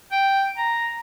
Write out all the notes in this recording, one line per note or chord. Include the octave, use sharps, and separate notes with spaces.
G5
A#5